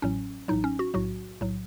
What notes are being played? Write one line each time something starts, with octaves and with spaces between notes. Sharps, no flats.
A1 A2 F#3 C#4
A1 A2 F#3 D#4
C#4
F#4
B1 A2 F#3 F#4
B1 A2 F#3